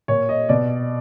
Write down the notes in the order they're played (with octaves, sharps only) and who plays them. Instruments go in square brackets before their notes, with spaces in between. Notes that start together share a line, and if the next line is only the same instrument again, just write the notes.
[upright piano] A#2 C#5
D#5
B2 D5